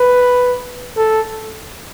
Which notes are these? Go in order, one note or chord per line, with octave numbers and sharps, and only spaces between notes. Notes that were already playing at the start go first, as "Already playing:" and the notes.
Already playing: B4
A4